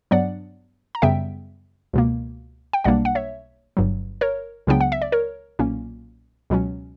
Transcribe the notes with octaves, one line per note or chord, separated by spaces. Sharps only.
G2 F#3 B3 D4 D5 F#5
A#5
F#2 C#3 G3 B3 E5 G5
C#2 B2 A#3
G5
B1 B2 G3 A#3 D4 D5 F#5
F#5
C#5 E5
G1 G2 F#3
A#4 C#5
C#2 C#3 F#3 B3 D4 G5
F#5
E5
D5
A#4 C#5
B1 A#2 A#3 C#4
C#2 B2 F#3 C#4